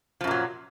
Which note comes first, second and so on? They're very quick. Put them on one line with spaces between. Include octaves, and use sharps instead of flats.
F3 F#2 A#2 F#3